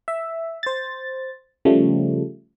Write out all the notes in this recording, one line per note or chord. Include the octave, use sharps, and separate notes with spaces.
E5
C5 A6
C#3 F3 G3 A3